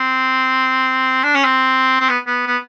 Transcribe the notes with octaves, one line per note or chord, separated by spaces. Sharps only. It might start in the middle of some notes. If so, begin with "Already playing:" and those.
Already playing: C4
D4
C#4
C4
C4
B3
B3
B3